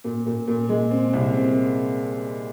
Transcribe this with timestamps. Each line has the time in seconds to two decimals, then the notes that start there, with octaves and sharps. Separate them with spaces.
0.04 A#2
0.26 A#2
0.48 A#2
0.69 G#3
0.91 C4
1.13 C2
1.34 C4